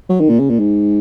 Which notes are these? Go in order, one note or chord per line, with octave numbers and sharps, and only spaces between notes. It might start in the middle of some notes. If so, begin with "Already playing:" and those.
F#3
D#3
A#2
C#3
A#2
G#2